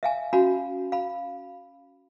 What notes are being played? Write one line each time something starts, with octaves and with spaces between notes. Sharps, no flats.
E5 F5 G#5
C#4 F#4 F5 G#5 B5
F5 B5